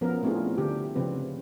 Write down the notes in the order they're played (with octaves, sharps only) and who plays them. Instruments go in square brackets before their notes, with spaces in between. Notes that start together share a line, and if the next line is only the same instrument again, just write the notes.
[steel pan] F3 B3 C#4 A#4
A3 C4 D4 E4 F4 G#4
D3 D4 G4
C#3 F3 C4 B4